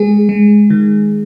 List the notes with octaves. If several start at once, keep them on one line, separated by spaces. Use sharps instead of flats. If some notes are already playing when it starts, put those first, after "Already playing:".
Already playing: G#3 G#4
G#3
D#3